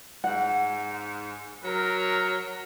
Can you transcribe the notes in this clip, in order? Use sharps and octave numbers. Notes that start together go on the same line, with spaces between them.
G#2 F#5
F#3 A#4